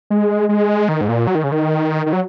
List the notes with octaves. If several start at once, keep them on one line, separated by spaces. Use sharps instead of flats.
G#3
G#3
D#3
G#2
A#2
F#3
D#3
C#3
D#3
D#3
F#3